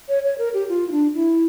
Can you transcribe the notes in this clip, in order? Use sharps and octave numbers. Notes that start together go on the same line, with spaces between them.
C#5
C#5
A#4
G4
F4
E4
D4
E4